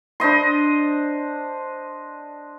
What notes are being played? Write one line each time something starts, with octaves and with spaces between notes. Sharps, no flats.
D4 C5 D#5 C6